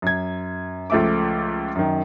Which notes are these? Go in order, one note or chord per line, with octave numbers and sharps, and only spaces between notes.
F#2 G#6
C#2 F3 A3 E5 D6
F#2 D#3